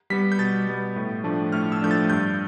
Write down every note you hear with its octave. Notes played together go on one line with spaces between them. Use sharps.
G3 B3 B6
G6
B2 A6
G3 B3
A2
F3 A3 D4
A2 F6
E6
F3 A3 D4 G6
A6
G2 G6